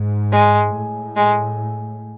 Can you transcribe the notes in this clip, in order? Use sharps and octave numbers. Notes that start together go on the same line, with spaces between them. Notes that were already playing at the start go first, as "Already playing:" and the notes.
Already playing: G#2
G#3
A2
G#3